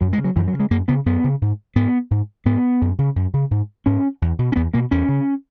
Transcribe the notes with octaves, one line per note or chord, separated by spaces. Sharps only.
F#2 F#3
G#3
C#3
F#3
F#2 E3
F#3
C#3
G#3
F#2 A#3
C#3 B3
F#2 B3
C#3
G#2
G#2 B3
G#2
G#2 B3
F#2
C#3
F#2
C#3
G#2
G#2 C#4
E2
B2
C#4
E2 B3
B2 A#3
E2 C#4
C#3